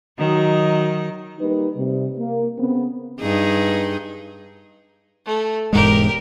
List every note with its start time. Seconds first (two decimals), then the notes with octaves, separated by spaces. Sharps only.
0.18 D#3 F#3 D#5
1.40 G3 A#3 D#4 G4 B4
1.75 C3 G3
2.17 A#3
2.58 C#3 B3 C4
3.20 G2 D#4 G#4
5.25 A3
5.73 E1 G#2 G#3 G4 A#4